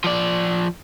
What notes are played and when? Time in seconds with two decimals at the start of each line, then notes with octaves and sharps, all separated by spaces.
0.04 F3 D5